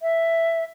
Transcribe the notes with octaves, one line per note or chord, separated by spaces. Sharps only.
E5